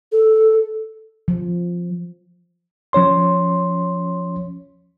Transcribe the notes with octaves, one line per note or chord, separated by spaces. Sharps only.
A4
F3
F3 C#4 C#5 C6